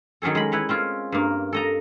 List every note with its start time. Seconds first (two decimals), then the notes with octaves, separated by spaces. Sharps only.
0.22 D#3 F#3 C#4 G#4 A4
0.35 G#3 B5
0.52 E4 B4 C#5
0.69 C4 C#4 F4
1.12 G2 A#3
1.53 A4 D#5 A#5